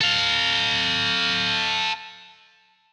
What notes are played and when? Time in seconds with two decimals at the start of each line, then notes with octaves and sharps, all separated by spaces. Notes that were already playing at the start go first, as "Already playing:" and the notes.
0.01 A4 F5